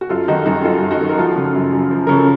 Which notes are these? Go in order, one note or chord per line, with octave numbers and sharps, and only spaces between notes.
F#4
F#2 F4 A4
D#3 D#4 F#4
F#2 D#4 F#4
D#3 F4 A4
F#2
D#4 F#4
D#3
A#4
F3 F4 A4
C#3
F#2
F#2
F3
C#3 A#4
A4